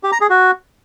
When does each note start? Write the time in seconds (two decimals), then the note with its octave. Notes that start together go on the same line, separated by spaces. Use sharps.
0.03 G4
0.12 A#5
0.21 G#4
0.30 F#4